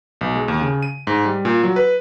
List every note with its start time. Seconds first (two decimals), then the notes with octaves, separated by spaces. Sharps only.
0.21 B1
0.36 G#3
0.48 D#2
0.61 C#3
0.83 D#7
1.07 G#2
1.25 G3
1.45 A#2
1.63 F#3
1.76 B4